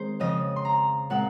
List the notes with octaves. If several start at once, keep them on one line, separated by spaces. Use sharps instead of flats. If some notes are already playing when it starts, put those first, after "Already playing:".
Already playing: D#3 G#3 C4 G#4 C5
F2 C#3 F3 D#5
C6
A#5
A#2 G#3 C4 F#5